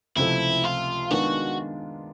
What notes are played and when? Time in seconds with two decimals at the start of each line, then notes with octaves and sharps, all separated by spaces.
0.16 C#2 C3 F3 A3 E4
0.64 F4
1.11 D#3 G#3 B3 D4 F4 F#4